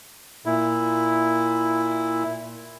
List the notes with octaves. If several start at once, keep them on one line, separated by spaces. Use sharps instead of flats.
A#2 E4